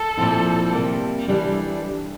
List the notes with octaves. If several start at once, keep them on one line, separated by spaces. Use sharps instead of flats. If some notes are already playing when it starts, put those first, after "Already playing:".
Already playing: A4
A#2 F3 C4 E4
C3 G3 A#3
C3 E3 G3 D4 A4